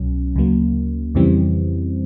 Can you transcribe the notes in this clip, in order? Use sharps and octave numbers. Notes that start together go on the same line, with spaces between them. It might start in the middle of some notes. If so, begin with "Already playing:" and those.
Already playing: C2 B2 F#3 C#4
D2 C#3 F#3 A#3
F2 C#3 E3 G3 C4